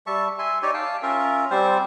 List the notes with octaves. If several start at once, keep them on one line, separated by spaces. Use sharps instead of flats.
G3 E5 A5 C#6
E5 G#5 C6
D#4 G4 C#5 D5
F5 G5 A5
C#4 F4 A#4 E5
G3 C4 C5